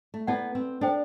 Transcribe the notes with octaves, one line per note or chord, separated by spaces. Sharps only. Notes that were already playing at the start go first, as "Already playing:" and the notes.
A3
B3 E4 A4 D5 F#5 A5
C4
D4 A4 C5 G5